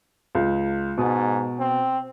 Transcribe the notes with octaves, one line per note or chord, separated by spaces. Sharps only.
C#2
G#2 B2 D#6
C4